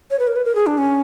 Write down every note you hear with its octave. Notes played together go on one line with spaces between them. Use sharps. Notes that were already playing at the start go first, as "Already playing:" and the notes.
C#5
B4
A#4
B4
A#4
G#4
D4
C#4